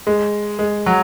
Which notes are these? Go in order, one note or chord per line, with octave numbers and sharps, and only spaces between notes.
G#3
G#3
F#3